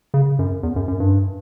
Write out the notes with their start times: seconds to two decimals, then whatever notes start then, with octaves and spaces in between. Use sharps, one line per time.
0.14 C#3
0.39 F#2
0.63 E2
0.76 F#2
0.88 F#2
1.00 G2